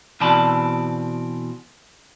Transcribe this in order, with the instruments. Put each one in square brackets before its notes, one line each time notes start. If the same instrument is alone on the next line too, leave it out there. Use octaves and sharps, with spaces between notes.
[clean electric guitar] B2 E3 C4 D5 A5 B5